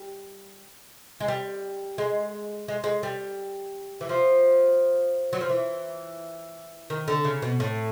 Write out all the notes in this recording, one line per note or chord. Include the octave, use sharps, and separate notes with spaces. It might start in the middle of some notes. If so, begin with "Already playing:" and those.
Already playing: G3
G#3
G3
G#3
G#3
G#3
G3
E3
F3
F#3
F3
E3
D#3
D3
C#3
B2
A2